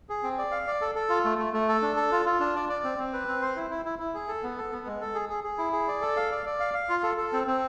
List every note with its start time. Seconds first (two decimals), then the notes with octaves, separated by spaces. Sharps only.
0.09 G#4
0.23 C4
0.38 D5
0.52 F5
0.67 D5
0.81 A4
0.95 A4
1.09 F4
1.25 A3
1.38 A3
1.53 A3
1.69 A4
1.82 D4
1.96 A4
2.12 F4
2.26 F4
2.40 D4
2.55 D5
2.69 D5
2.84 C4
2.98 C4
3.13 B4
3.28 C4
3.42 C5
3.56 E4
3.70 E4
3.85 E4
3.99 E4
4.14 G#4
4.28 A4
4.43 B3
4.57 A4
4.72 B3
4.86 G#3
5.01 A4
5.15 G#4
5.29 G#4
5.44 G#4
5.58 E4
5.73 G#4
5.88 D5
6.01 A4
6.17 F5
6.32 D5
6.46 D5
6.60 F5
6.74 F5
6.89 F4
7.03 A4
7.17 A4
7.33 C4
7.47 C4